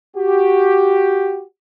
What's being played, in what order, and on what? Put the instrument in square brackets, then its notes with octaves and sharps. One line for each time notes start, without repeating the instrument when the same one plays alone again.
[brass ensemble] F#4 G4